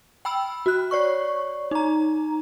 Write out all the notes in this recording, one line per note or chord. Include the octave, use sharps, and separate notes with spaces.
G5 B5 E6
F#4 F#6
C#5 D5 C#6
D#4 A#5